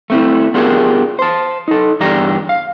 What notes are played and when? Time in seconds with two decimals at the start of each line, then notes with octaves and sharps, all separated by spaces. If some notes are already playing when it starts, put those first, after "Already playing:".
0.10 A3 C4 E4
0.54 B3 D4 F4 G4 G#4 A#4
1.19 C5 A5
1.68 D#4 A4
2.00 E2 G2 D4 G4 A#5
2.49 F5